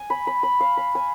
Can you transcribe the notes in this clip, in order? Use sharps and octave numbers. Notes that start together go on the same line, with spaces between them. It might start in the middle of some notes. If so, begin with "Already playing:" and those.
Already playing: G#5
B5
B5
B5
F5
B5
G#5